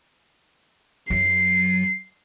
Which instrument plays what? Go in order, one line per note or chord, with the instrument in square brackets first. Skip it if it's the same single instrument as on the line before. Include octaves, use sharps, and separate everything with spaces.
[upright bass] F#2 F#3 [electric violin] C7